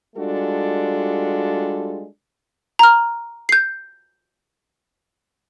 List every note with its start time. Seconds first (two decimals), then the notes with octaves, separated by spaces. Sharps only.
0.16 G3 G#3 D4 F4 F#4 A4
2.79 A#5 F6
3.49 G6 C7